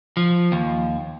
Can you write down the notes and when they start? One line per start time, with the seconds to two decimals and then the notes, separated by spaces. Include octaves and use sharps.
0.17 F3
0.52 D#2